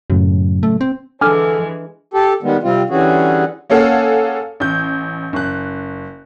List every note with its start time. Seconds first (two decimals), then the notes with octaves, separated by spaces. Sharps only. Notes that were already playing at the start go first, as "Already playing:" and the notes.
0.10 F#2 A2 C#3 F#3
0.63 A3
0.81 C4
1.21 D3 E3 G#3 D4 A4 G#5 D6 F6
2.14 G4 A4
2.43 D#3 G3 G#3 B3
2.63 C3 G3 C4 F4
2.90 D3 E3 G3 C#4 F#4 G#4
3.70 A#3 C#4 G#4 A4 F5 F#5
4.60 A1 G6
5.33 F#1 F#6